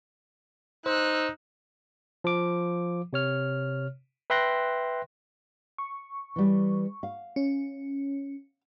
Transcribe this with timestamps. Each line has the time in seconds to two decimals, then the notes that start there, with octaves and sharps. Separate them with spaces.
0.86 D#4 C5 E6 F#6
2.24 F3 D6
3.13 C3 C#5 F6
4.30 B4 E5 G5 C6 F#6 A#6
5.78 C#6
6.36 E3 G3
7.03 F5
7.36 C#4